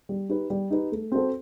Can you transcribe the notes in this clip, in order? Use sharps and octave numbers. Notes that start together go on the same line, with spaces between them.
G3
D#4 G4 B4
G3
D#4 G4 B4
A3
C4 F#4 A4 C5